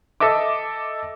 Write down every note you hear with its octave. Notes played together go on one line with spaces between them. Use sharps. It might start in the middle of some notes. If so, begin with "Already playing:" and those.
A4 D#5 E5 D6